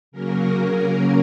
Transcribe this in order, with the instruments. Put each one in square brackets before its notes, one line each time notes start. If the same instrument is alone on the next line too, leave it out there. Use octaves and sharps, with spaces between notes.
[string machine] C#3 F#3 A#3 C#4 A#4